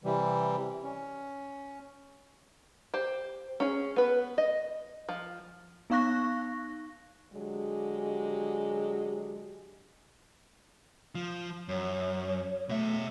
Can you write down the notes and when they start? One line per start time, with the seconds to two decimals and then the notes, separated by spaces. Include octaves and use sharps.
0.04 C3 E3 G3
0.83 C#4
2.94 G4 C5
3.60 C#4 G#4
3.96 B3 B4
4.38 D#5
5.09 F3
5.90 B3 D#4 F5 C#6 F#6 A#6
7.33 D3 F#3 G#3 G4 G#4
11.15 F3
11.69 F#2 C#5
12.69 B2 A3 E5